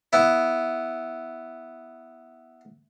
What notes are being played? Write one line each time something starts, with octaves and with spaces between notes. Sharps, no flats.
B3 E4